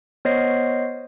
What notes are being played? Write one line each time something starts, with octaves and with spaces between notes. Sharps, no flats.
B3 C5 C#5 D#5 A#6 C7